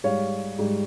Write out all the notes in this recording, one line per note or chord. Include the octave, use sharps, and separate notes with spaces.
G#2 G3 C#5 F5
G#2 G3